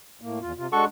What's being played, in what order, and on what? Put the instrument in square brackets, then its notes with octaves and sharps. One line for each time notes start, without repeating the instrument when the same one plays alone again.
[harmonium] A2 A#3
E2 F4
C3 F4
[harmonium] G#3 D4 F#5 [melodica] F#4 A4 C#6